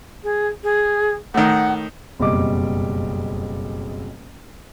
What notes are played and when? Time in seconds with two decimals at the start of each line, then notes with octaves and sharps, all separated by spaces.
0.24 G#4
0.64 G#4
1.34 A2 D#3 F#5
2.19 F#1 F2 B2 G3 D#5 D6